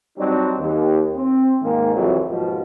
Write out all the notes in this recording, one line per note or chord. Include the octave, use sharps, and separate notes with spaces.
F#3 G3 C4 D4 D#4
D#2
C4
G#2 D#3 G#3 A#3
C2 F2 E3 F#3
D#2 G#2 B2 F3